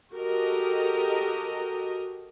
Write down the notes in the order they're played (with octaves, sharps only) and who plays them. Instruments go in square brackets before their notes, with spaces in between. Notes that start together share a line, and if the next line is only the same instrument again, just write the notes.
[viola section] F#4 G4 A4 A#4 D#5